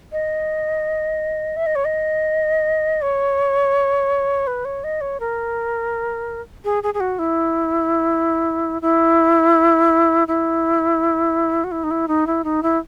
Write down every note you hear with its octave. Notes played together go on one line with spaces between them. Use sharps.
D#5
E5
D#5
C#5
D#5
C#5
B4
C#5
D#5
C#5
A#4
G#4
G#4
G#4
F#4
E4
E4
E4
F#4
E4
D#4
E4
D#4
E4
D#4
E4